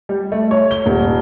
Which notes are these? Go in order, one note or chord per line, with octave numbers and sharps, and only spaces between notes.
G3
A3
C#5
G7
D#1